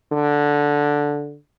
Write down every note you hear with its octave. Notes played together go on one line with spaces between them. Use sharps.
D3